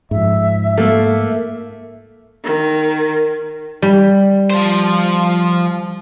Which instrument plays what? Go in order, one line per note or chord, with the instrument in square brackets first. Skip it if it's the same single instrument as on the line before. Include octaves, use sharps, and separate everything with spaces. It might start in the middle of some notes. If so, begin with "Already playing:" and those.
[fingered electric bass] G#2 F3 [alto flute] E5
[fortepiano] A3 [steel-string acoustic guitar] A#3
[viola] D#3
[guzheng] G3
[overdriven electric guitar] F3 C5